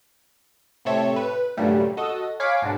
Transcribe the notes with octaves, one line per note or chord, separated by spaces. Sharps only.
A2 C3 C4 A4 C#5 E5
B4
G2 A#2 C#3 F#3 G3 A3
F#4 A4 D#5
C#5 F5 G#5 B5 C#6 D6
G#2 B2 G#3 D4